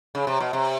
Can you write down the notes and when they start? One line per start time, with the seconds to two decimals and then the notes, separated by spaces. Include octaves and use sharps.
0.15 C#3
0.27 C3
0.40 B2
0.53 C3